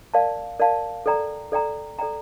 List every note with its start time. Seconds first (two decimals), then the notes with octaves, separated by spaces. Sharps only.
0.14 A#4 D5 F5 A5
0.59 A#4 D5 F5 A5
1.06 A4 D5 G5 A#5
1.52 A4 D5 G5 A#5
1.99 A4 D5 G5 A#5